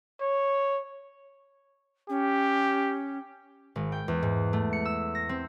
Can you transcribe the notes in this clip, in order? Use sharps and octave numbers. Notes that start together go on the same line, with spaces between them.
C#5
C#4 G4
G#1
G5
E2
G#2
A3
C#7
E6
A#6
C4